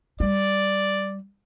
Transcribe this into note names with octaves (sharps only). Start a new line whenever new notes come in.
G3 D5